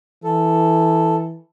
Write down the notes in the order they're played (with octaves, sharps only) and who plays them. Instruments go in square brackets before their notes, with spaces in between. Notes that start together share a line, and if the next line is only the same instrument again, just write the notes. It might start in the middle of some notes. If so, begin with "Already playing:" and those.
[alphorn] E3 [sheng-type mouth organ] A4